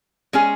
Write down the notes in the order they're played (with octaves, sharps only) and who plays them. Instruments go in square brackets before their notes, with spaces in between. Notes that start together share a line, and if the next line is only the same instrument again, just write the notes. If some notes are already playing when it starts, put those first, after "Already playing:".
[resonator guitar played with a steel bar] G#3 C#4 G#4